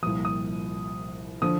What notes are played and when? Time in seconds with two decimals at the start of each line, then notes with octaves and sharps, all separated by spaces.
0.02 C2 A#2 F3 D#6
0.25 D#6
1.42 D3 F3 D#6